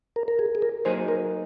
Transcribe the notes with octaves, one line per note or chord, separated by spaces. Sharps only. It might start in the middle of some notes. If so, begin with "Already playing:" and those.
A#4
A#4
G#4
G#4
A#4
F#3 A#3 D#4 G#4 C5
A#4